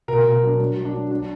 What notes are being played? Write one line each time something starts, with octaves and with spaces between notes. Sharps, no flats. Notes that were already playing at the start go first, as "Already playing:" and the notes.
B2 A#4
B2
F#3 D4
F#3
F#3
D4
F#3
F#3 D4